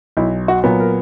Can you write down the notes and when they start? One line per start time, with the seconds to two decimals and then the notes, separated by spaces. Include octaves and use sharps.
0.17 B1 E4
0.48 F#4
0.64 A#2 F#3 B3
0.80 A#4